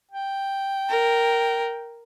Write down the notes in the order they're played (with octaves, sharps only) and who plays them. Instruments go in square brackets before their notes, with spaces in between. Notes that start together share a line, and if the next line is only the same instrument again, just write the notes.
[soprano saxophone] G5
[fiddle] A#4